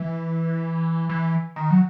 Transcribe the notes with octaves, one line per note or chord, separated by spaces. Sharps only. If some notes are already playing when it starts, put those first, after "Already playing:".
Already playing: E3
E3
D#3
F#3